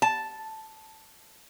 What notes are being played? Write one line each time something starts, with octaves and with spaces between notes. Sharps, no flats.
A5